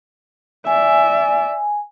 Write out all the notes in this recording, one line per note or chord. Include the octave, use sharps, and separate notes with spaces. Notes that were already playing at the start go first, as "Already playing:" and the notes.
D5 E5 G#5